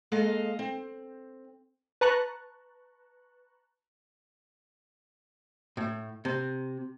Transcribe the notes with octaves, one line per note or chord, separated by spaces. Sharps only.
G#3 A#3 A4 D#5 F5
C4
B4 A5 A#5 C#6 F#6
A2
C3